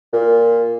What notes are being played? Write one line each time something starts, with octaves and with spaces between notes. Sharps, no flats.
A#2